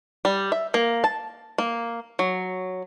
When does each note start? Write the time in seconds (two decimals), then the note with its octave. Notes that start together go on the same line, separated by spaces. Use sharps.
0.25 G3
0.52 E5
0.74 A#3
1.04 A5
1.58 A#3
2.19 F#3